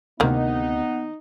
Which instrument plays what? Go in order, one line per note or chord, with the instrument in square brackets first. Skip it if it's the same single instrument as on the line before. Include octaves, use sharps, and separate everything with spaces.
[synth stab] D2 C3 [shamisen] D#3 A#3 [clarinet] B3 [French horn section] D#4